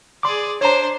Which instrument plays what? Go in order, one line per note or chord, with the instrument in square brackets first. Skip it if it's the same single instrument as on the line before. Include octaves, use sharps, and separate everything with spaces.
[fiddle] G#4 D5 [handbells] C6 D6
[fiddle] D4 C5 [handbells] C#5 A#5